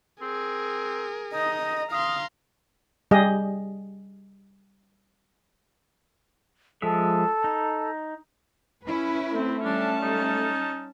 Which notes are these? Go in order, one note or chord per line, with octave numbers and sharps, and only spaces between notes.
C4 G#4 A#4
D#4 D#5 A#5
F5 A#5 C6 D#6
G3 G4 G#4 D#5
F3 G#3 A4 E5
D#4
C#4 E4 B4
A3 C4
G3 C#4 D4 A5
D#4